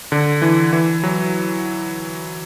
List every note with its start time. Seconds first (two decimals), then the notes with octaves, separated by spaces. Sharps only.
0.12 D3
0.42 E3
0.73 E3
1.03 F#3